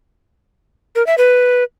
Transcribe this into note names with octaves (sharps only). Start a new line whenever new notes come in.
A#4
E5
B4